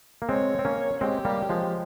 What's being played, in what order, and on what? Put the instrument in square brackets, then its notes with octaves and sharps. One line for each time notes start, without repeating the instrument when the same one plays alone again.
[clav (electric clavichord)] A#3
[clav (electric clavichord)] G#3 C4 [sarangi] C#5
[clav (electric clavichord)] C4
A#3 C#4
[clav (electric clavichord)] G#3 C4 [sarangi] G4
[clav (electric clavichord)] G3 A#3
F3 G#3